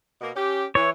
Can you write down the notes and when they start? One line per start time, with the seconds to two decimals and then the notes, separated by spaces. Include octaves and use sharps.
0.21 B2 A#3
0.35 C#4 G4
0.75 E3 C#5